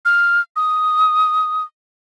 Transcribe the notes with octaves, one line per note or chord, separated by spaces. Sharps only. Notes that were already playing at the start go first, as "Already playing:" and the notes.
F6
D#6